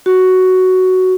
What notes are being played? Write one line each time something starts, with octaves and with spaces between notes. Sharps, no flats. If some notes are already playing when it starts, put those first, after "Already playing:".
F#4